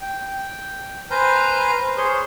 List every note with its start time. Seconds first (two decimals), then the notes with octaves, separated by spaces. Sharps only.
0.01 G5
1.11 B4 C5 G#5 A#5 F6 G6
1.97 G#4 C5 C#5 C6